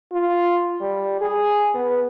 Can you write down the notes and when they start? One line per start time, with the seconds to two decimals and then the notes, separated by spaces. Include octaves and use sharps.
0.12 F4
0.81 G3
1.21 G#4
1.75 B3